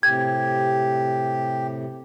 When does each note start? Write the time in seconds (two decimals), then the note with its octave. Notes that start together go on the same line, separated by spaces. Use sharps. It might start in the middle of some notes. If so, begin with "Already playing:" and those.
0.03 A2 C3 G4 G#6